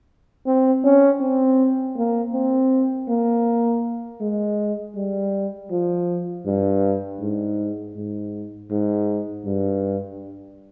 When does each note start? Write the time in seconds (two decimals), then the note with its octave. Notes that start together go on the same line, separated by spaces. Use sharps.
0.46 C4
0.84 C#4
1.21 C4
1.96 A#3
2.33 C4
3.09 A#3
4.21 G#3
4.96 G3
5.71 F3
6.46 G2
7.20 G#2
7.96 G#2
8.71 G#2
9.45 G2